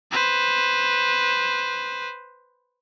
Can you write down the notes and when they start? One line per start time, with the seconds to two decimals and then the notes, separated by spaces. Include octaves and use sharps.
0.12 B4 C5